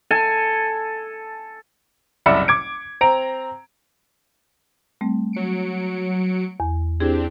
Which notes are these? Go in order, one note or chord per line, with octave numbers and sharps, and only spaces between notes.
A4 G#5
F#1 C2 D5 E5 B5 C#7
D6 G#6 D7
C4 A#5 D7
G3 A3 C4
F#3 C#7 D7
E2
C4 D4 E4 G4 G#4